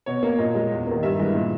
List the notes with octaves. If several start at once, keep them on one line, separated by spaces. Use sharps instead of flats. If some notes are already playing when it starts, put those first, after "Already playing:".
B2 C#5
A#3
A#2 D#5
G#3
E2
D#3 A#3
G2 E5
E3 G#3
A#2